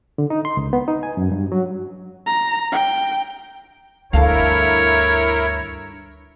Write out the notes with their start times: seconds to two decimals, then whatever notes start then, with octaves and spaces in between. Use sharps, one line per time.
0.18 D3
0.30 D#4
0.45 C6
0.57 C#2
0.73 B3
0.88 D#4
1.03 G#5
1.17 F#2
1.32 G2
1.52 F#3
2.27 A#5
2.72 G5
4.13 D2 G2 E4 A4 A#4 C#5 F5